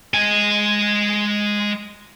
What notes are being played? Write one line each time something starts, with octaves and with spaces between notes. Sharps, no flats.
G#3 G#5